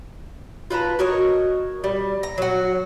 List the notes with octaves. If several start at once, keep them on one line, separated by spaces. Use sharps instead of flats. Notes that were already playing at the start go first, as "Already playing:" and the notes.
F4 B4 A5 A#5
F#4 A#4 C#5 D#5
G3
A#5
F#3 F#4